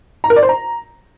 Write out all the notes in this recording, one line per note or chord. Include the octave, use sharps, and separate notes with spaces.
A#5
A#4
D5
C5
A#5